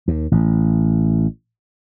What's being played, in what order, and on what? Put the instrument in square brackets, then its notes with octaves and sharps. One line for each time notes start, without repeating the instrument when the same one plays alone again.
[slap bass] D#2
A1